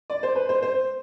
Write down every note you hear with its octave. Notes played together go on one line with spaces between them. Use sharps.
D5
C5
B4
C5
C5